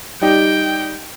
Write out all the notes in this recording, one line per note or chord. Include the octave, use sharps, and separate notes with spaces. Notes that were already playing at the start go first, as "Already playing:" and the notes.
G3 D#4 G4 G5